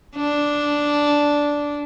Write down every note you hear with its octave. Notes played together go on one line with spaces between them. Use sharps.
D4